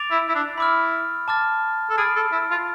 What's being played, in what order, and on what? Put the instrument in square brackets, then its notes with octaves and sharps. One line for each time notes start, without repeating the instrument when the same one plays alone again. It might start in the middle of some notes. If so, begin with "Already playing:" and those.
Already playing: [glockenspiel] D6 A6 D7 F7
[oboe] E4
E4
D4
[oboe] E4 [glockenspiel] B5 D6 F6
[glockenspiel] A5 D6 F6 A6
[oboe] A4
[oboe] G#4 [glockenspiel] B5 D6 F6 A6 D7
[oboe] A4
E4
F4